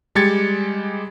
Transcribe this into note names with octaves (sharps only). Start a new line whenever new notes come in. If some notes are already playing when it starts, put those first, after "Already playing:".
G3 G#3 G4 G#6 A6 C#7